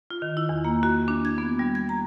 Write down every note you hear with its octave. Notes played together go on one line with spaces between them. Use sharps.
F4
D#3
E4
E2
A#3
F#4
D4
G#6
B3
G3
G#6
A#5